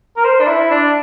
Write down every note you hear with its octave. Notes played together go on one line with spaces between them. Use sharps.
A#4
C5
D4
E4
D4